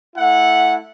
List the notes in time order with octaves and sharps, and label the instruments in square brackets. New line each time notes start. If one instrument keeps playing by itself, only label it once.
[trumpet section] A3 E4 F#5